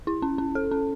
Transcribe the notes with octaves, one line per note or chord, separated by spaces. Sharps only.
E4
C#4
C#4
A4
C#4